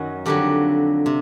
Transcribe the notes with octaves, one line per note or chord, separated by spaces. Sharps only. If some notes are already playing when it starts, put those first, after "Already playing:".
Already playing: F#2 D#3 F#3 F#4
F2 D3 F#3 G4
C3